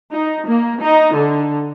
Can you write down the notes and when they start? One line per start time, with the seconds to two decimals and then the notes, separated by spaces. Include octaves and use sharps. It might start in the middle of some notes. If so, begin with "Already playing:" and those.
0.13 D#4
0.47 A#3
0.82 D#4
1.16 D3